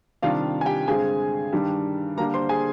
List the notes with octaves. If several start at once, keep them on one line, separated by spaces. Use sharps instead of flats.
C3 D#3 G3 D4 F4 F5
G#5
G4 G5
G2 D3 G#3 C4 G#4 G#5
G2 D#3 G3 D4
D3 G3 A#3 D4 A#4 A#5
C5 C6
G#4 G#5